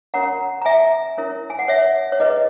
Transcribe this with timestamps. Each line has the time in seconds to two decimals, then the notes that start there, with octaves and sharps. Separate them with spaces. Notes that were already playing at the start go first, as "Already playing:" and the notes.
0.14 C#4 F#4 A#4 C#5 F#5 A#5
0.62 A#5
0.65 E5 G#5
1.18 C#4 E4 A#4 C#5
1.50 G#5
1.59 F#5
1.68 C#5 E5
2.12 C#5
2.20 E4 G#4 B4 D#5